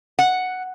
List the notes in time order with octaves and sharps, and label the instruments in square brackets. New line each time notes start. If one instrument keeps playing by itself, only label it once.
[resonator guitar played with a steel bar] F#5